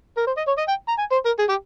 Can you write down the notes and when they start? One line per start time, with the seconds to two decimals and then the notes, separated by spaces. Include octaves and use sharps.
0.17 A#4
0.27 C5
0.37 D#5
0.47 C#5
0.58 D#5
0.68 G5
0.88 A#5
0.99 G#5
1.12 C5
1.25 A#4
1.39 G#4
1.49 G4